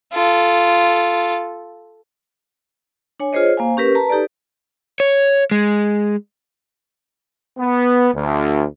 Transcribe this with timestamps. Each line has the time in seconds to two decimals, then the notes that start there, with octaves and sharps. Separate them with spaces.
0.13 F4 A4
3.20 D4 C#5 G#5
3.33 F4 G#4 C5 C#5 D#5
3.57 A#3 C5 F5 G#5
3.77 C#4 G4 A#4 B4
3.95 B4 A5 A#5
4.10 D#4 G4 A4 B4 D5
5.00 C#5
5.51 G#3
7.58 B3
8.14 D2